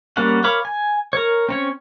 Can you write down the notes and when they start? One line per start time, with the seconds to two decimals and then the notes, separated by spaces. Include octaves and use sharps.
0.17 G3 A#3 C#4 F#5
0.44 A#4 C#5 F5 B5 D6
0.65 G#5
1.13 A#4 C#5
1.49 C4 C#4 C#5